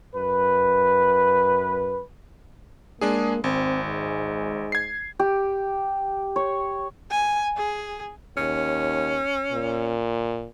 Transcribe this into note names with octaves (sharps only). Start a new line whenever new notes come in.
F#2 B4
G#3 A#3 D4 G#4
G#1 C4
G#2
G#6 C7
G4
C#5
G#5
G#4
D#2 C#4
A#2